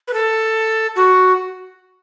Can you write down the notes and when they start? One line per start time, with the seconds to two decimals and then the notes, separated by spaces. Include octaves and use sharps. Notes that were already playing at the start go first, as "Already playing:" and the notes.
0.08 B4
0.13 A4
0.96 F#4